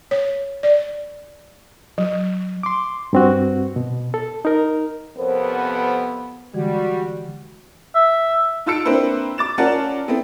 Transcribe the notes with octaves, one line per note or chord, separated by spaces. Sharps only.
C#5
D5
F#3
C6 D6
G2 C4 F#4
B2
A4
D#4 A#4
F2 C3 B3 A#4 C5 C#5
D3 E3 G3 G#3 F#4
E5
G#2 F4 A5 E6 C#7 D7
A#3 C4 D4 E4 B4 C5
D6 A6 E7
C#4 F4 A#4 D5 F#5 A5
B3 C4 E4 A4